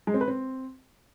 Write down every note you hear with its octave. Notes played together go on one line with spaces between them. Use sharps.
G#3
C4
B4
C4